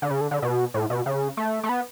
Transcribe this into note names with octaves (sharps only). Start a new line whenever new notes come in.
D3
C#3
D3
D3
B2
A2
B2
C#3
A3
A3
B3